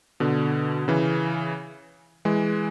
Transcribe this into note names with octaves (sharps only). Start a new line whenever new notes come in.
B2 D3
C#3 E3
E3 G#3